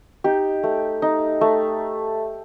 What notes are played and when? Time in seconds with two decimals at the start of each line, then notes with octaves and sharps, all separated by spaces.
0.24 D#4 G4
0.63 A3
1.02 D#4
1.41 A3